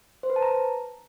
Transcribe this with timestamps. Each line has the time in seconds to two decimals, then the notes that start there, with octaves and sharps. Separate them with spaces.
0.23 C5
0.30 B4
0.36 A5
0.43 A#5